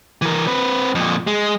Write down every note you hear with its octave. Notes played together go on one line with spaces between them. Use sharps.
E3 A#4
C4 B4
F2 A#2
G#3